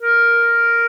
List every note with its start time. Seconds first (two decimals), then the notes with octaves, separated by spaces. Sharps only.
0.01 A#4